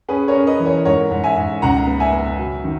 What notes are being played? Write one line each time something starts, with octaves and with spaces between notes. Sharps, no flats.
C#4 G#4 B4
A#4 C#5
C#4
B4 D#5
E3
A#4 C#5
G#2 A#4 C#5
G#2
E5 G#5
G#2
C#2 F#5 A#5
B3
E5 G#5
B3
F#3
D#3